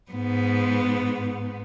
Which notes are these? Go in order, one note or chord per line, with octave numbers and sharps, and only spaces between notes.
G#2 B3